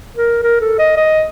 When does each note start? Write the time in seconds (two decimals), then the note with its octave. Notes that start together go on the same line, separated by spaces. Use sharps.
0.17 A#4
0.43 A#4
0.61 A4
0.79 D#5
0.97 D#5